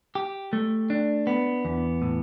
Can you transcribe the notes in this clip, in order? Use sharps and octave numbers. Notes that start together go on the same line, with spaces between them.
G4
A3
D4
B3
E2
A2